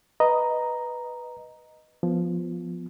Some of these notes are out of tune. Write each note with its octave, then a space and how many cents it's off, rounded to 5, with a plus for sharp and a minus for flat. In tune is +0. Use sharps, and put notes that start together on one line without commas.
B4 +0 D#5 +0 A#5 +0
F3 +0 B3 +0